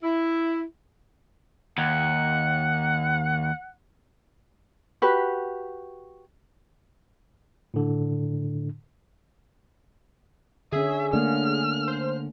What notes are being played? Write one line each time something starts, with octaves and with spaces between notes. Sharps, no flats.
E4
D#2 F#5
F#4 G4 B4
A2 D3
D3 C#4 G#4 E5
D3 A3 A#3 F6
C5